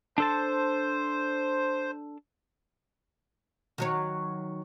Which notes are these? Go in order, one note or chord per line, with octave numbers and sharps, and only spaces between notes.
D4 A4 C5 A5
D#3 F#3 C#5